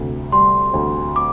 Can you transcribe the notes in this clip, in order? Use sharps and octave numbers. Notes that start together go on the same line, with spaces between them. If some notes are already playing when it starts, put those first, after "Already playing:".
Already playing: D2 C3
G3 C6
D2
D6